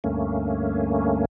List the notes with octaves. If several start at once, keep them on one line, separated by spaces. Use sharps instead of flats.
D2 G2 A3 A#3 C#4